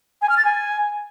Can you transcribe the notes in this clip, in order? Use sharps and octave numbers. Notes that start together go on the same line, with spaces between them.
G#5
F6
A6
G#5